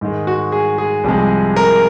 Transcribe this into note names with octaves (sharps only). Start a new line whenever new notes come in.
G#2 D#3 G#3
F#4
G#4
G#4
C2 C3 F3 G#3
A#4